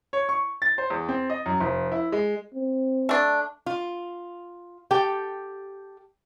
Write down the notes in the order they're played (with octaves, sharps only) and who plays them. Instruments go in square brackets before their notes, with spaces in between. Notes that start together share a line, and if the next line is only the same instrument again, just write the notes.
[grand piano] C#5
C#6
A6
C5
E2
C4
D#5
F#2
F1
E4
G#3
[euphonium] C4
[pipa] A3 D4
[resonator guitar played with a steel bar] F4
G4 A4 G5